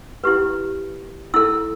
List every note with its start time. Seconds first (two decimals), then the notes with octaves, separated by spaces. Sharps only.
0.24 E4 G4 B4
1.34 E4 A4 E6